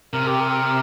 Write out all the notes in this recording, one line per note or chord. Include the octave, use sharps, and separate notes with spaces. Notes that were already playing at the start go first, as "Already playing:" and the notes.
C3 A#4
G4
A#4